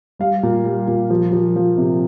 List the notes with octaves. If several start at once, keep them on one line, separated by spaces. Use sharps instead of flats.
G3 F5
A#2
G3
A#2
F3
F3
F3
C3